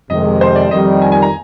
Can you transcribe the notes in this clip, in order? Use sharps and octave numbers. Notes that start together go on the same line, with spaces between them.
F2 C3 D#3 G#3 D#5
C5
D5
F2 D#3 G3 D#5
G#5
G#5
A#5